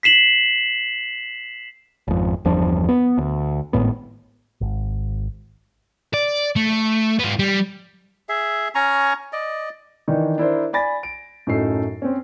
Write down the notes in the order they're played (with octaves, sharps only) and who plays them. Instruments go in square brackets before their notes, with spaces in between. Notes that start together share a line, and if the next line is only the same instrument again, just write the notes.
[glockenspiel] B6 C7 E7 F#7
[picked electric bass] G#1 F2
G1 E2 F3 D4
B3
D2
G#1 F#2 A2 B3
G#1
[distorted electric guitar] D5
A3
B3 F4
G3
[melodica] G#4 E5
C#4 G#5 A#5 C#6
D5 D#5
[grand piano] D#3 E3 D4 D#4
D4 E4 A#4 C5
D5 G#5 B5 A6 A#6
D7
F#2 A2 F#3 D#4 A4 C7
C4 C#4